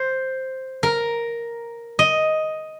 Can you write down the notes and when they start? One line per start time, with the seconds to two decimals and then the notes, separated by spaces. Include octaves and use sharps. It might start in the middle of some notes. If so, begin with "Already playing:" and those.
Already playing: C5
0.83 A#4
1.99 D#5